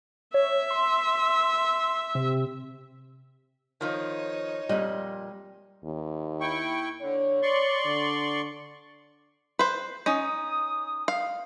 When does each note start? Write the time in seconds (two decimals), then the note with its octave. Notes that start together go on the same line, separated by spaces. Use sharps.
0.34 C#5 E5
0.70 C6
2.15 C3
3.81 D#3 F3 D#4 C#5
4.69 F2 A#2 G3 D#5
5.84 D#2
6.40 E4 G5 C#6
7.01 D3 C#5
7.43 D5 C6 C#6
7.86 D3
9.59 B4 C5
10.06 C#4 D#4 D#6
11.08 F5